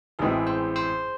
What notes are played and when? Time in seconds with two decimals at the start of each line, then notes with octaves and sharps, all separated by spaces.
0.19 A1 A2 G#3 C4 E4 G#4
0.47 C5
0.76 C5